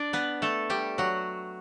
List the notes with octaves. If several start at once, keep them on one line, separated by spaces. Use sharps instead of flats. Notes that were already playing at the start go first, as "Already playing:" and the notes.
Already playing: D4 D5
B3 B4
A3 A4
G3 G4
F#3 F#4